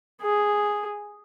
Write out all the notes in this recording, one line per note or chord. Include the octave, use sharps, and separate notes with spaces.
G#4